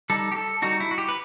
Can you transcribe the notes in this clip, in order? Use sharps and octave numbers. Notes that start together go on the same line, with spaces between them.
G3 D#4 A4
G4
A4
G3 D#4 F#4
E4
F#4
G4
B4